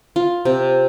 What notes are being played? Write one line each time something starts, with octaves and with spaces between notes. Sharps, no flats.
F4
C3